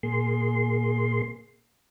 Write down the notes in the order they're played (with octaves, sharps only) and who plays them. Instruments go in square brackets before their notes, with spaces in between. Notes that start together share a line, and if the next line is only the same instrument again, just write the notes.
[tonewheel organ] A#2 A#3 G#4 C6